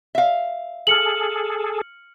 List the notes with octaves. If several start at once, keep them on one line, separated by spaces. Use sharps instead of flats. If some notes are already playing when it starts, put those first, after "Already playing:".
E5 F5
G#4 A4 F6 C#7 F#7